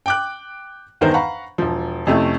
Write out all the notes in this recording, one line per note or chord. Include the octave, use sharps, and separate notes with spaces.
G5 D6 F#6
G1 E2 D#3 D#4 A#4 C5
F5 F#5 A#5 B5 C#6
E1 F3
F2 C3 A3 C#4 E4